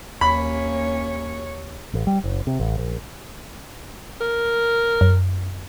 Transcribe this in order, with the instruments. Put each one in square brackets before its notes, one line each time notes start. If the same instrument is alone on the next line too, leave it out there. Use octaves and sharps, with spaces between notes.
[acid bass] D#2 [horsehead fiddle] A#3 C#4 [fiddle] C#5 [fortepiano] B5
[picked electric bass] A1
G3
F#1
C3
A1
A#1
[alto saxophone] A#4
[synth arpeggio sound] F#2